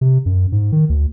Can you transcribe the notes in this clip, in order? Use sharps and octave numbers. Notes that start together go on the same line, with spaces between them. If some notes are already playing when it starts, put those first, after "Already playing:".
C3
F#2
G#2
D#3
D2